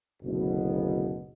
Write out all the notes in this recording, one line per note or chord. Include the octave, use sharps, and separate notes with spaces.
F#1 D2 B2